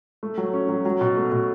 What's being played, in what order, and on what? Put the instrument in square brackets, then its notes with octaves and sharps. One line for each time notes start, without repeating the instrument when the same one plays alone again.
[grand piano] A3
F#3
C#4
F#3
F#3
B2
A3
B2